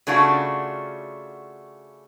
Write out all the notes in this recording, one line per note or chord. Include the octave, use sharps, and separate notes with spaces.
C#3 A3 D4 F4 F#4